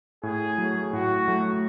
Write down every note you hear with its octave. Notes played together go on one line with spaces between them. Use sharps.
A2 G#4
F#3 A3
A2 F#4
F#3 A3